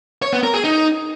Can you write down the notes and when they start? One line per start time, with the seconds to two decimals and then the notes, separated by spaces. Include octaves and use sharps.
0.22 C#5
0.33 B3
0.43 A#4
0.54 G#4
0.64 D#4